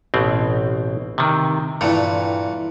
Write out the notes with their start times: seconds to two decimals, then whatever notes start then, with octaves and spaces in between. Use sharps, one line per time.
0.14 A1 B2 C4
1.18 C3 D#3
1.81 G2 A#2 E3 A3